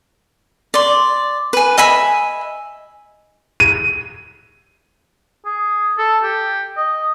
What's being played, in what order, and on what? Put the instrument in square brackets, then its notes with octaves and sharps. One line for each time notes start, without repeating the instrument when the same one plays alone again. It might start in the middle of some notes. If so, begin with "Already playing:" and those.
[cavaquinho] D5 C6
B4 G#5
D#5 E5 G#5 B5
[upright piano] D#7
[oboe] G#4
A4
G4
D#5